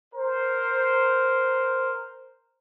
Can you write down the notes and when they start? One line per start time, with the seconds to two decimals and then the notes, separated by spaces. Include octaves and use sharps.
0.14 A#4 C5